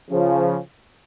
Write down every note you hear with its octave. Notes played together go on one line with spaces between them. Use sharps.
C#3 F3